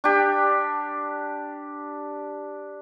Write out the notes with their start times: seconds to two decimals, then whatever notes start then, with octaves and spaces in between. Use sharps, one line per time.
0.04 D4 G4